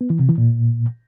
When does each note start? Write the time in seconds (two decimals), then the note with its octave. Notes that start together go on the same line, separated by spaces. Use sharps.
0.01 B3
0.10 E3
0.19 C3
0.29 E3
0.38 A#2